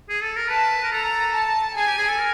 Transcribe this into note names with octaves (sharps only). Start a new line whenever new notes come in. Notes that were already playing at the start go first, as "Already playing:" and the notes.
G#4
A4
A#4
B4 A5
A#4
A4 A#5
A5
G#4 G#5
G4
G#4
A4
A#4